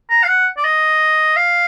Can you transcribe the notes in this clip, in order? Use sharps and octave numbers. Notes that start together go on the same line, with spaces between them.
A#5
F5
F#5
D5
D#5
F5